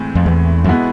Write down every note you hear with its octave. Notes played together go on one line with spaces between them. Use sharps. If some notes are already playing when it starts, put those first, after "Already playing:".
Already playing: A2 E3 G#3 C4
F2
E2
F#2
B2 G#3 B3 E4